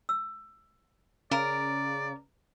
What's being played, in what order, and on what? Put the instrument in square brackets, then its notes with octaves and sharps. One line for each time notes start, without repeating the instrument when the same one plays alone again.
[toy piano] E6
[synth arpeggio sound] C#3 [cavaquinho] A#4 [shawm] D5